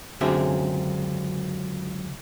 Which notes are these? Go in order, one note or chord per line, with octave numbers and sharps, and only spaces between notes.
C#2 F#2 D3 C4 G#4 E5